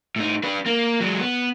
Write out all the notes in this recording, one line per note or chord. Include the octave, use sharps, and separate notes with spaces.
A2 D#4
D4 B4
A#3
F#3 G#3
B3